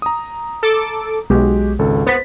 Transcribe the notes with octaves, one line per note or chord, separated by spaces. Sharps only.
A#5 D#6
A4 D6
B1 G#3 F#4 G4
G#1 C#2 A4
B3 C5 A6 B6